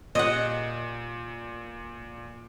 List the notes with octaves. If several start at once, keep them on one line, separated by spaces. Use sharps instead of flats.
A#2 D#5 F#5